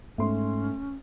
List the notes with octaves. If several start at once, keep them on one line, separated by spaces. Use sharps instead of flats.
G#2 A3 C#4 C6